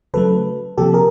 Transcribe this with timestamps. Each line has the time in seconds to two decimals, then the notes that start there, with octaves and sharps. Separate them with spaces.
0.14 C#3 F#3 A3 A4 B4
0.78 C3 F3 A#3 G4 A4
0.94 G#4 A#4